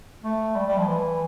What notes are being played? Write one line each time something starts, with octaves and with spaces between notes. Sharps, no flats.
A3
G3
G3
F3
E3